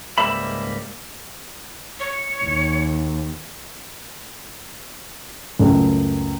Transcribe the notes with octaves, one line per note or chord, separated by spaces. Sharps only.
C#2 G#2 G3 A#3 E5 B5
C#5
D#2
C#2 F#2 A3